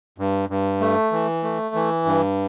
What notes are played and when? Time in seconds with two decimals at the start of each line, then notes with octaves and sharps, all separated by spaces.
0.18 G2
0.49 G2
0.81 A3
1.12 E3
1.43 A3
1.75 E3
2.06 G2